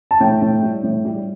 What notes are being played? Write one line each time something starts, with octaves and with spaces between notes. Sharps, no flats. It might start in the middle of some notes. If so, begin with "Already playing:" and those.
A5
A2 G5
A2
G3
A2
G3